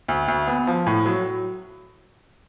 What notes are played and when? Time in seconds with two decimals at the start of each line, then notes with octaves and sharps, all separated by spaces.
0.08 D2
0.28 D2
0.47 B3
0.67 F3
0.87 A2
1.06 F#3